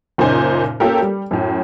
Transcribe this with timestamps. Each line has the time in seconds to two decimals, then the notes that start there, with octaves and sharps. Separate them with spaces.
0.18 F#1 A#2 C#3 D#4 C5 G#5
0.80 A#3 C#4 F4 G4 A4 A#4
1.02 G3
1.31 F#2 A2